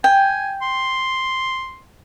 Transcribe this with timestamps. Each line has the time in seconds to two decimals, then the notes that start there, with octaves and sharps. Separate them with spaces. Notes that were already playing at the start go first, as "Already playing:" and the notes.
0.04 G5 G#5
0.62 C6